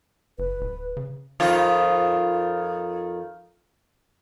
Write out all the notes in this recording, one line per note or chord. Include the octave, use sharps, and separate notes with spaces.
F#1 B4
D1
C#3
F2 D#3 F4